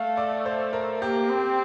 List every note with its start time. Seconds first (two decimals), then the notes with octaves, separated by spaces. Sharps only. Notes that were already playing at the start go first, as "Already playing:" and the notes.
Already playing: A3 F5
0.17 D5
0.45 C5
0.73 A#4
1.02 A#3 G4
1.30 C4